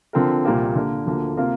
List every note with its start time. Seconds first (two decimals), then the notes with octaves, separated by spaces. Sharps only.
0.13 D3 F3 C4 A#4
0.44 C2 A#2 F3 A#3 G4
0.75 D3 A#3 F4 A#4
1.06 D2 D3 F3 A#3
1.37 C3 A#3 F4 A#4